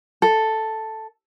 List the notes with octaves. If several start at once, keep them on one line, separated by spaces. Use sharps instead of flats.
A4